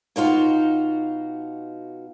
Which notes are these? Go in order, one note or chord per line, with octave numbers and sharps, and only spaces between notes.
B2 D#4 F4 F#4